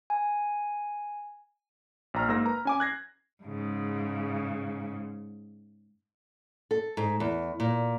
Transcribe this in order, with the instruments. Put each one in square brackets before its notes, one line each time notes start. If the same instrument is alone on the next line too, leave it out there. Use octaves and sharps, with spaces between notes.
[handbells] G#5
[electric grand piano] A#1 A#5 F6
G#2 A#3 E6 A#6
B4 A#5
C#4 G#5 D6
F#6 G#6 A#6 C7
[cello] G#2 C#3
[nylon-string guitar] A4
G#2
E2
A#2